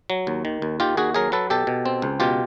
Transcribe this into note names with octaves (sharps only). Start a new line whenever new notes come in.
F#3
D#2
D#3
D#2
D#3 F4 G4
D#2 F#4 G#4
F#3 G#4 A#4
F#3 A4 B4
B2 G4 A4
B2
C4
C#2
B2 F4 G4